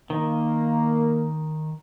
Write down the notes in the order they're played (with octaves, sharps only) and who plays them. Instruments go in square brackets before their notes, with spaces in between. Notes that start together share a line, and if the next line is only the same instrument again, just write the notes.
[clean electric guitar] D#3 [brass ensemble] A#3